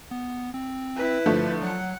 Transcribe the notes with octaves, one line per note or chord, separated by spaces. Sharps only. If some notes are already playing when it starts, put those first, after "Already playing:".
B3
C4
E4 B4
G2 D3 F3 A3
F#3 F#5